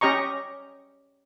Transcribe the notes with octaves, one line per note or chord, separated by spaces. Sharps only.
C#4 G4 D#5 A#5 C#6